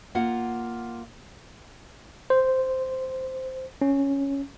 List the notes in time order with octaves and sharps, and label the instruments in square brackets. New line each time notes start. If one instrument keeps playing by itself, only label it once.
[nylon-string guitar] A#3 F4 F#5
[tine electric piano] C5
C#4